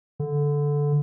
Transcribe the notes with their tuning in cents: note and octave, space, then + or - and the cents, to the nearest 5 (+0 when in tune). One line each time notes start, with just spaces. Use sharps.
D3 -10